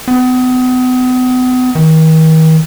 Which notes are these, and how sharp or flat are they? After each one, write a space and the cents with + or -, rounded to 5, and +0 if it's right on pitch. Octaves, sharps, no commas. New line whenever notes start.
B3 +40
D#3 +40